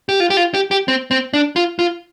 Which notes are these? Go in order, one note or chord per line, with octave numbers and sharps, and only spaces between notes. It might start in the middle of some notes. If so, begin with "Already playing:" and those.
G4
F4
G4
F4
G4
G4
C4
C4
D4
F4
F4